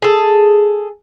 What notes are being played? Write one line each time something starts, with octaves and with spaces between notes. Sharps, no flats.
G#4 A4